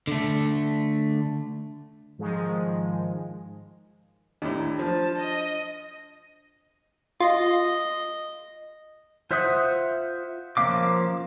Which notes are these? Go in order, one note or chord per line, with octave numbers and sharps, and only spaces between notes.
D3 A3
G#2 D#3 F3 G#3
D#2 A2 D4
F3 A5
D#5
F4 D#5
F4 C5 E5 F#5 D#6
F3 A#3 C#4 F5 D6